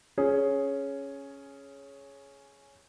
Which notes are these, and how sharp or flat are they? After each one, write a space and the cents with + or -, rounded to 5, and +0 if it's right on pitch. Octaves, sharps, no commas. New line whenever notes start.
C#4 +0 G#4 +10